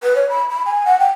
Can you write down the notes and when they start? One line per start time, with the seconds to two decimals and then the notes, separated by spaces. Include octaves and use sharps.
0.03 B4
0.15 C#5
0.29 B5
0.49 B5
0.66 G#5
0.86 F#5
0.99 G5